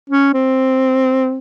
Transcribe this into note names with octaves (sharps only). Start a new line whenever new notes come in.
C#4
C4